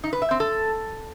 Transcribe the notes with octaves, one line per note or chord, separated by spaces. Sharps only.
D#4
B4
E5
C4
A4